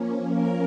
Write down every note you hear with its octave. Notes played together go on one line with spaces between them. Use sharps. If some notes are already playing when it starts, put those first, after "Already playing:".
Already playing: F3 A#3 C#4
A#4